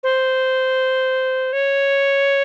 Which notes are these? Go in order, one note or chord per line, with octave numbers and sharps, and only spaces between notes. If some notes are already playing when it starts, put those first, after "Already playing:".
C5
C#5